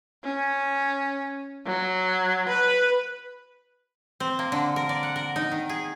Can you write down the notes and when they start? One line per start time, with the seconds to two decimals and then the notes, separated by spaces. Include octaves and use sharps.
0.24 C#4
1.66 F#3
2.49 B4
4.20 C4
4.39 A#3
4.52 D3
4.76 A#4
4.89 D5
5.03 F#5
5.16 A#4
5.36 D#4
5.52 D#3
5.69 G#4